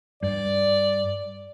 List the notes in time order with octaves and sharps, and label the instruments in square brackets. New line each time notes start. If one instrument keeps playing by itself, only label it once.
[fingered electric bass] G2 [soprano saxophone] D5